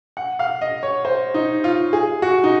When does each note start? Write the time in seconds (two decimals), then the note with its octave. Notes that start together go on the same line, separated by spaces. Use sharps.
0.17 F#5
0.39 F5
0.61 D#5
0.83 C#5
1.05 C5
1.34 D#4
1.64 F4
1.93 G#4
2.22 F#4
2.44 D#4